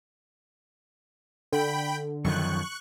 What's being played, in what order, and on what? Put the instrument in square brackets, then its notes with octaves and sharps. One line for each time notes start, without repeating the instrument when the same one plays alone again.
[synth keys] D3 [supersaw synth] G5 B5
[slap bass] F#2 D#3 F3 [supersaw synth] C#6 F#6